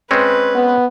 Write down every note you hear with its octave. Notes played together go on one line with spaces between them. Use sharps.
G#3 C4 C#4 B4
B3